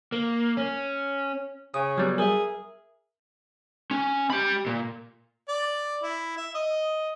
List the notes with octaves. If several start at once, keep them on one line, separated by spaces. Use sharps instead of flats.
A#3
C#4
C#3 D#6
F#3 G3 B3
G#4 A#4 E5
C#4
G4 B5
A#2
D5
E4
E5
D#5